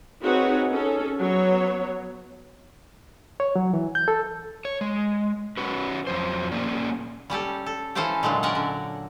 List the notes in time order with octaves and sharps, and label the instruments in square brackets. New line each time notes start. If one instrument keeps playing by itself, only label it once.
[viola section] C4 D#4 F#4 G#4 B4 C#5
C#4 G#4 A4
F#3 B3 C#5
[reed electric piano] C#5
F#3
E3
G6
A4
[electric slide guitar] C#5
G#3
C#4 F#4 B4
F2 F#3 C5
A#3 C#4 G#4 D5
[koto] G3 C#4 G4 A4
A4
E3 C#4 A4 C5 F5 G5
A#2 D3 F#3 G#3 A3
C#4 A#4 D5 F#5
D3